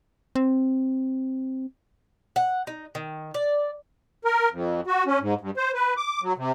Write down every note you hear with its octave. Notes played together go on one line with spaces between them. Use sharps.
C4
F#5
D#4
D#3
D5
A#4
F2
F#4
C#4
G#2
G2
C5
B4
D6
F#3
C3